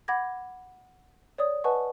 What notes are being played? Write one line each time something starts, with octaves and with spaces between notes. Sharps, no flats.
F#5 B5 D6 G#6 A#6
C#5 D5 D#6
B4 D#5 F#5 G#5 A5 C#6